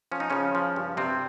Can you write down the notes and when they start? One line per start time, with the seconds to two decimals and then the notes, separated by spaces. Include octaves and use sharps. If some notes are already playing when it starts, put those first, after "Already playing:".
0.12 F3 C#4
0.20 D#4
0.30 C#3 F3 C#4
0.55 F3
0.76 G2
0.97 G2 C3 C4